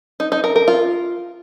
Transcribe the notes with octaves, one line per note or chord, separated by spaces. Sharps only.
D#4
D#4
A#4
A#4
F4